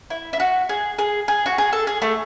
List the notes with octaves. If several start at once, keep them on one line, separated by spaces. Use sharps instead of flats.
E4
E4
F#4
G#4
G#4
G#4
F#4
G#4
A4
G#4
A3